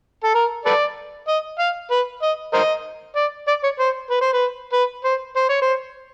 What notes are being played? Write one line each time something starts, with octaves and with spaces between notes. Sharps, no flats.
A4
A#4
A4 B4 D5
D#5
F5
B4
D#5
A#4 C5 D#5
D5
D5
C#5
C5
B4
C5
B4
B4
C5
C5
C#5
C5